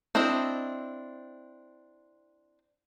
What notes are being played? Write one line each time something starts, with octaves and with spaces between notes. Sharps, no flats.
C4 D4 E4 C5 D#5